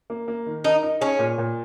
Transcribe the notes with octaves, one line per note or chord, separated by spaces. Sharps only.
A#3
A#3
D#3
D#4 A#4
D#4
C#4 G#4
A#2
A#2